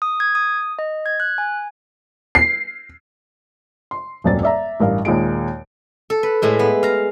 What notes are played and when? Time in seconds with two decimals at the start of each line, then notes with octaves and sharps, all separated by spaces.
0.02 D#6
0.20 G#6
0.35 D#6
0.79 D#5
1.06 G#6
1.20 F#6
1.38 G#5
2.35 C7
3.91 C6
4.24 D#1 G#1 F#2 D5 A6
4.43 D5 E5 A#5
4.80 A1 G2 A#4 F5
5.05 D#2 A#2 G#3 D7
6.10 A4
6.23 B4
6.42 A2 G#3 E4
6.59 B3
6.83 F5 A#5